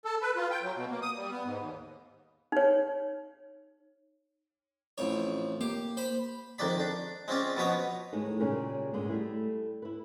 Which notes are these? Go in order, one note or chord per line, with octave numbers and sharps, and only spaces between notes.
A4
B4
F4
G5
F#3
B2
A#3
D#6
G3
B3
G#2
D#2
D#4 C#5
A1 F2 C#5
A#3 G4
C5 B5
F2 D#3 G#3 D5 B5
D4
G#3 C4 C#4 F4 D5
B2 F3 B3 B4 C#5 D#5
D#2 A2 G#3 A3 B3 D#4
A#2 C#3 G3 G#3 C#4 A#4
D2 G#2 D3 G#3 B3
G3 A3 E4
E4 B4